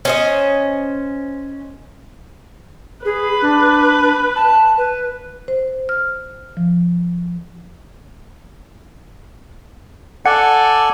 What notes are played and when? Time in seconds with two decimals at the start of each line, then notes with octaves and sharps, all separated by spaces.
0.05 C#4 C5 D#5
3.05 G#4 B4
3.42 D4
4.36 A5
4.77 B4
5.48 C5
5.89 F6
6.57 F3
10.26 A4 D5 F#5 G#5